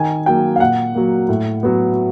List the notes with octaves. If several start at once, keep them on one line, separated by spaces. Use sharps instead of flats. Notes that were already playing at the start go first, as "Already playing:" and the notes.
Already playing: D#3 G#5
F#3 A#3 G5
F5
A#2 F#5
F#3 A#3
A2
F#3 B3